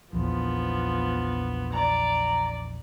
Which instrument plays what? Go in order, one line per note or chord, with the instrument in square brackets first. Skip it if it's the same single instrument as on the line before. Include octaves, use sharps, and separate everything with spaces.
[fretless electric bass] A#1 E2 [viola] F3 B3
[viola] D5 [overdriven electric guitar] A#5